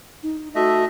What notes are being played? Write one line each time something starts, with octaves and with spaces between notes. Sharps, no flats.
D#4
A3 F#4 D#5 E5